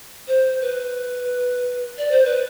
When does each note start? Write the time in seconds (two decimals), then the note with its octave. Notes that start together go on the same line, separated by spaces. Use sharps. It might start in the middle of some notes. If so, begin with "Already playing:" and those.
0.28 C5
0.61 B4
1.98 D5
2.11 C5
2.25 B4